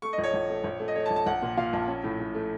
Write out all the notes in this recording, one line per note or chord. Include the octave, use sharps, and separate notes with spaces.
A3 C#6
D#5
A#1
C#5
A#1
A3
A#1
A3
D#5
A3 C#5
A5
A#1
A5
A#1 F#5
A#2
A#2 F5
A#1 A5
C#4
A2
A2
A3